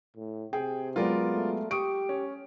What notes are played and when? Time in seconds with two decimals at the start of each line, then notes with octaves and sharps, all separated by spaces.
0.16 A2
0.53 C3 G#4 G5
0.96 F#3 G#3 B3 F4 A#4 D5
1.31 A3
1.71 G4 C#6 D#6 D7
2.09 C#4